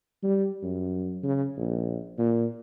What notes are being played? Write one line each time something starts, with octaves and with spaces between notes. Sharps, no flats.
G3
F#2
C#3
A#1
A#2